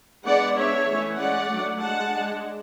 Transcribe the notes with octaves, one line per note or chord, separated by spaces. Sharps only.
G#3 B3 D4 D5 F#5
G#3 D4 C#5 E5
E3 A3 C#4
G#3 C#4 D5 F#5
F#3 A3 D4
G#3 D4 F#5 A5
G#3 D4